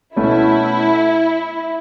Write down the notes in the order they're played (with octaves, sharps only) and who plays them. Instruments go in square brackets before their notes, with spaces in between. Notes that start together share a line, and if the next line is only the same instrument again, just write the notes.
[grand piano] B2 A3 C#4 [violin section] E4